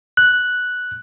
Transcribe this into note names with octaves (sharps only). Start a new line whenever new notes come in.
F#6